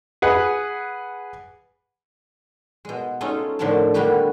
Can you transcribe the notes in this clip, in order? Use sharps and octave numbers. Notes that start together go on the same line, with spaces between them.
G#4 B4 F#5
B2 G#3
G#3 C#4 D#4 F4 A4
A2 D3 D#3 F3 D5 A5
D3 G3 A#3 B3 F#4 G4